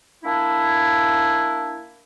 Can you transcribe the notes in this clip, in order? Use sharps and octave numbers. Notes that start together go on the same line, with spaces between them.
A#3 D4 E4